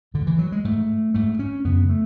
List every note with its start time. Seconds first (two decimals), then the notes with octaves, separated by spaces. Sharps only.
0.14 G#2 D3
0.27 E3
0.39 F#3
0.52 G#3
0.65 G#2 A3
1.14 G#2 A3
1.39 C#4
1.65 F#2 C#3 B3
1.89 A3